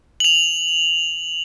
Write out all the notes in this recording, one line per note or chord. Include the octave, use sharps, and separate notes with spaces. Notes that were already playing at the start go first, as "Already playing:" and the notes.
F7 F#7